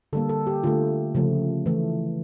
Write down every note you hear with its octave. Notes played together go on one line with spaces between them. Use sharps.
D3 G3 A#3 A4
A4
G4
D3 A3 F4
C#3 F3 A3
E3 A3